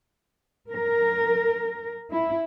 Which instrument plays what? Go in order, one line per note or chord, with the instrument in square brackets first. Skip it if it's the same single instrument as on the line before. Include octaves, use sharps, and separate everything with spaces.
[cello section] A#4
E4